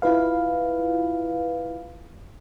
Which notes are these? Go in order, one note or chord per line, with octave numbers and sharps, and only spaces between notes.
E4 F4 B4 F5